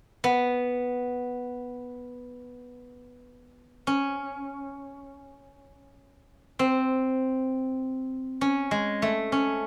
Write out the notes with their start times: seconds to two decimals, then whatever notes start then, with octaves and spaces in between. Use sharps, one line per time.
0.24 B3
3.87 C#4
6.59 C4
8.41 C#4
8.71 G#3
9.02 A3
9.32 C#4